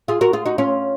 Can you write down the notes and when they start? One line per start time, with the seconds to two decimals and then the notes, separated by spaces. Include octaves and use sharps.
0.08 F4 G#4
0.21 F#4 A#4
0.33 F4 G#4
0.46 D#4 F#4
0.58 C#4 F4